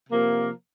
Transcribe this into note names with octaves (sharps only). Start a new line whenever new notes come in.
C3 F3 A#3